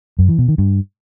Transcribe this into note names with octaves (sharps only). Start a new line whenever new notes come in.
F#2
E3
B2
D#3
G2